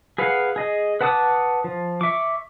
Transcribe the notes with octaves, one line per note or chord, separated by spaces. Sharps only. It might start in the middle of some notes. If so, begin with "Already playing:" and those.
G#4 B4 F5 F#5
G#4 D#5
B4 F#5 A5 D6 D#6
F3
E5 C#6 D6